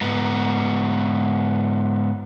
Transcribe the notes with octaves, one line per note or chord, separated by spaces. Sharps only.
G#2 B3